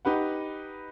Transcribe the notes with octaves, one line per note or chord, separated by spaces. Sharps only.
D#4 G4 B4 F#5